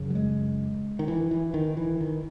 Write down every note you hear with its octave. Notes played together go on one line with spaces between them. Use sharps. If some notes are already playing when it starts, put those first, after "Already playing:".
Already playing: F#2 C#3
F#3
G#3
D#3
E3
E3
D#3
E3
D#3